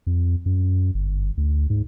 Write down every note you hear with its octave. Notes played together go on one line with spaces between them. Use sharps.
F2
F#2
G1
D2
G#2